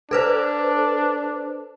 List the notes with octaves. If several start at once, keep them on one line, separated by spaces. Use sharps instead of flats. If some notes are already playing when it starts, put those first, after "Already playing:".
D4 A4 B4 C5